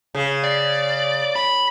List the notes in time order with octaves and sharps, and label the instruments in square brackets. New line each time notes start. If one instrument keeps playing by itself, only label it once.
[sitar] C#3
[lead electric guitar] D5
B5